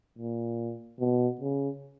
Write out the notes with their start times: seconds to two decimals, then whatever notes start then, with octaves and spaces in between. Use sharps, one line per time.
0.18 A#2
0.99 B2
1.41 C#3